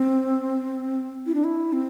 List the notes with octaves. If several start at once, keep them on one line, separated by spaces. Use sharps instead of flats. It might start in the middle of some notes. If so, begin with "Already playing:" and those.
Already playing: C4
E4
D4
E4
C4